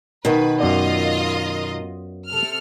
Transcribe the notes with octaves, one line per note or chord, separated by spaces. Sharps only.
B2 D#3 B4
F#2 B3 F4 D5 D#5
C3 A4 F6